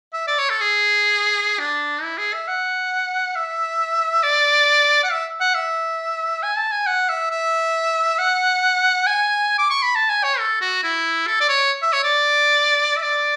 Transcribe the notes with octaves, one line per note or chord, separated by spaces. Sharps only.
E5
D5
C#5
A4
G#4
D4
E4
G#4
E5
F#5
E5
D5
F#5
E5
F#5
E5
G#5
A5
G#5
F#5
E5
E5
F#5
G#5
D6
C#6
B5
A5
G#5
C#5
A4
F#4
E4
A4
D5
C#5
E5
C#5
D5
E5
D5